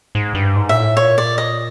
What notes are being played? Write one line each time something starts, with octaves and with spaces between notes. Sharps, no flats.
G#2
G2
G#2
A#2 E5
A2
A#2 C#5
D5
D#5